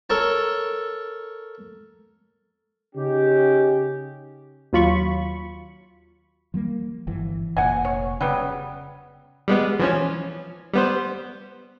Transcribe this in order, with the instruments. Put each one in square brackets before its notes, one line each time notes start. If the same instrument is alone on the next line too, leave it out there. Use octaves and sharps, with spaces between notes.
[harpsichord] A4 A#4 C#5 A5
[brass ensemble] C#3 C#4 D#4 G4
[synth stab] D#2 F#3 F4 B5 C#6
[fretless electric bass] F3 G3 A#3
G1 E3
[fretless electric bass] F1 A#2 [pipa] F#5 G#5
[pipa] C#5
[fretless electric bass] C#3 [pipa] F#3 G3 B3
[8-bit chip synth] G3 G#3 B3
E3 F3 C#4
G3 B3 C5